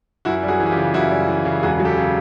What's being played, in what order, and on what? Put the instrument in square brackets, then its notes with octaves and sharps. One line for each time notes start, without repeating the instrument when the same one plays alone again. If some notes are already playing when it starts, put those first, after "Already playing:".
[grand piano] F#2 E4 F#4
G3
F#4 G#4
E3
F#4
F4 G4
C#3
F#2 E4 F#4
G3
E3
C#3
E1 F#4 G#4
F#3
G4 A4
C#3